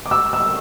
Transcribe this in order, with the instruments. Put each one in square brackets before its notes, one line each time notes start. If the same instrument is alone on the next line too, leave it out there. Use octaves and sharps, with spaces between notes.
[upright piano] D6
E6
E6